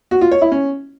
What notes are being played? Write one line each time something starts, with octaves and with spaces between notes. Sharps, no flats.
F#4
F4
C#5
E4
C#4